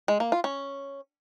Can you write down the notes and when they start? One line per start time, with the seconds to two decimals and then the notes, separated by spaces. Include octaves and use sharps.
0.08 G#3
0.20 A#3
0.32 F4
0.44 C#4